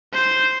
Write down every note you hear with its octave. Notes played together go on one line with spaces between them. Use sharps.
C5